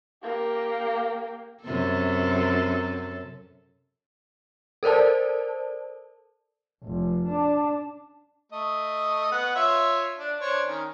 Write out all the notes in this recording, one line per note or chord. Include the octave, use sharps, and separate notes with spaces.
A#3 G4
F#2 C3 A4
A4 A#4 C5 D5 A5
F1
D4
A3 D#5
B3 F#5
F4 C#5 E5
D4
D4 C5 C#5
D#3 C#4